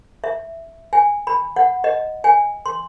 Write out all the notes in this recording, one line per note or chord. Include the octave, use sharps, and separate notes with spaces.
E5
G#5
B5
F#5
D#5
G#5
C6